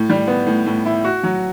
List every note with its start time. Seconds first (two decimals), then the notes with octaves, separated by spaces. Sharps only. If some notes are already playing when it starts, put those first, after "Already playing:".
Already playing: A2
0.10 G3
0.27 B3
0.47 A2
0.66 A2
0.85 E4
1.04 F#4
1.23 F#3